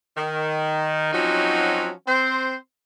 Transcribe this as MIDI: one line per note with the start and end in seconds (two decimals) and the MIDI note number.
0.17 1.12 51
1.13 1.90 53
1.13 1.90 54
1.13 1.90 60
1.13 1.90 61
1.13 1.90 63
1.13 1.90 66
2.07 2.55 60
2.07 2.55 72